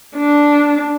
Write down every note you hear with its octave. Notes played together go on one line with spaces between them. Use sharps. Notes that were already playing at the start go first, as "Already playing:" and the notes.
D4